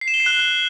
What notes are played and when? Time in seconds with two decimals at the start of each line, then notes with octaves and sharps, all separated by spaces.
0.01 C7
0.08 E7
0.14 G7
0.20 C7
0.26 F#6